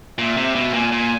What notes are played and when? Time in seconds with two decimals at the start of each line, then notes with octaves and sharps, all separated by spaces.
0.18 A#2 E5
0.37 C3
0.55 B2
0.73 A#2 G#5
0.92 A#2